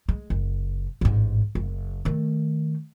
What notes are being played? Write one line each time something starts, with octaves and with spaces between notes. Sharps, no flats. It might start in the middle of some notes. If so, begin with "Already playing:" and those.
G#3
F#1
A1 G#2
F#1
D#3 A3